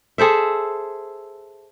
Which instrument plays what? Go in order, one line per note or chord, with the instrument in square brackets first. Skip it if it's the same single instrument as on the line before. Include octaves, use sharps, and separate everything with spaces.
[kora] G#4 A4 C5 E5